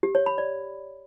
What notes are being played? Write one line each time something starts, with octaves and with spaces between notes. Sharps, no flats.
G4
C#5
B5
D5